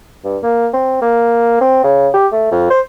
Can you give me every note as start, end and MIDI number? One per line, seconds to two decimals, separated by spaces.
0.24 0.38 43
0.43 0.68 58
0.73 0.98 60
1.02 1.61 58
1.61 1.82 60
1.84 2.08 49
2.14 2.27 67
2.32 2.48 57
2.52 2.68 41
2.70 2.81 72